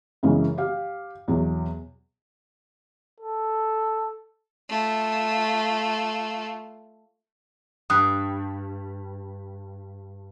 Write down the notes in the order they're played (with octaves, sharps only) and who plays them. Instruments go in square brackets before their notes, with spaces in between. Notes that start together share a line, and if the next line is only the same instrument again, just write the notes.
[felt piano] F#2 C#3 E3 G#3
G4 F5
E2 B2 F#3
[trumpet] A4
[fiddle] A3 F4
[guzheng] G2 [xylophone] D#6 F#6